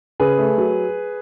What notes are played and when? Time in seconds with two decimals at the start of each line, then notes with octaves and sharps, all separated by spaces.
0.20 C#3 G#4 B4
0.38 A3
0.58 F#3